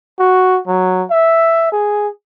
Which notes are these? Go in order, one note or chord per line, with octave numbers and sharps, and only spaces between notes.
F#4
F#3
E5
G#4